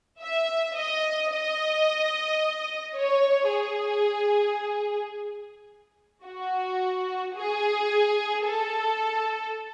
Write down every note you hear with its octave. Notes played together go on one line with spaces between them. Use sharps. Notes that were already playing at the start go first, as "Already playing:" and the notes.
E5
D#5
D#5
C#5
G#4
F#4
G#4
A4